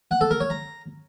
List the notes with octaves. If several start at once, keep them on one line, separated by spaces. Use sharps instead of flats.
F#5
A4
A#4
C#5
A#5